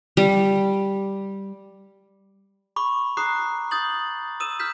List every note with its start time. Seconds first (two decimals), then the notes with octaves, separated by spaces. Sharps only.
0.17 G3
2.76 B5 C#6 D6
3.17 A#5 D6 D#6 F#6 C7
3.71 D#6 G6 A6 F#7
4.40 D#6 E6 D#7 E7
4.59 F6 G6 B6 E7